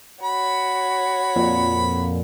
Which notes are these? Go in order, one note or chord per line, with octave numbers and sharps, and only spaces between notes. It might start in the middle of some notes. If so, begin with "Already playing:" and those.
F#4 C#5 B5
F2 A#2